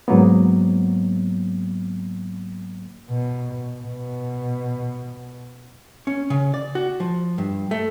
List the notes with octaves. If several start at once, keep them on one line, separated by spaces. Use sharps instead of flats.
G#2 F#3 A#3 B3
B2
B2
C#4
C#3
D5
F#4
F3
G2
A3